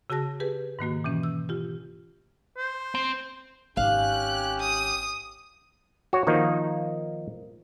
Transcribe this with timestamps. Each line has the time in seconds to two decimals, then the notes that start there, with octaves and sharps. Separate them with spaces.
0.10 C#3 F#4 G#4 A5 A#6
0.40 G4 G#4 B4
0.79 G#2 D#3 A#3 F#4
1.04 B2 E3 C#4
1.23 E6
1.49 F4 G4
2.57 C5
2.95 C4
3.77 G#1 C#4 G4 F5 F#6
4.60 D#6
6.13 F#4 C#5
6.27 D#3 F3 A#3 D#4